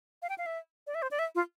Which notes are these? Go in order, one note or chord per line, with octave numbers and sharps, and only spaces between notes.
F5
G5
F5
E5
D5
E5
C5
D5
E5
F4